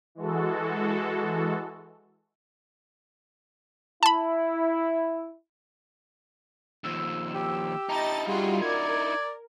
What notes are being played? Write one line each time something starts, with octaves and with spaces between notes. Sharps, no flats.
E3 G#3 F#4 A4
E4 A5 B5
D#2 F3 E6
G4
D#4 E4 D#5 A5 A#5 A6
G3 F4 F#4 G#4
A#4 D5 G#6